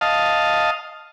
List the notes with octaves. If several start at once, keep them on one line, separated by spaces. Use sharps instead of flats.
D#5 F5 A5